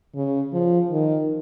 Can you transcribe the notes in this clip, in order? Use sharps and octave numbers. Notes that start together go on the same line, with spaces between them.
C#3
F3
D#3